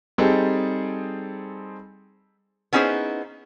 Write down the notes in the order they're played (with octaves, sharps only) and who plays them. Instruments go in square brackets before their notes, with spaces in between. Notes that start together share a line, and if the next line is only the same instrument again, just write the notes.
[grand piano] G3 C4 D#4 G#4 A4
[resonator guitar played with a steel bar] B3 C#4 D#4 E4 G#4 C5